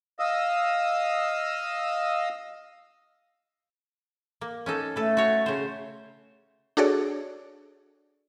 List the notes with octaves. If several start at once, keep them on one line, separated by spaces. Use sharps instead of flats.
D#5 F5 D#6 E6
A#3
C#4 D#4 A4
A3 A4 B4
F#4 C#5
C#3 C5
D4 F#4 G#4 A4 C#5 D5